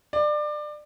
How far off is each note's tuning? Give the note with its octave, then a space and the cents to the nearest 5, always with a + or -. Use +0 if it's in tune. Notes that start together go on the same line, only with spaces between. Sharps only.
D5 +25